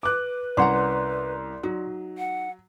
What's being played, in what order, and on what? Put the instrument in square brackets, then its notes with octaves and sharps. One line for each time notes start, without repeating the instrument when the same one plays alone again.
[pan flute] B4 [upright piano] D6 F#6
[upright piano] C2 [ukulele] C#4 F#5 A#5 [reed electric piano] D5 C6
[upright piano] F#3 [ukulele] D#4
[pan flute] F#5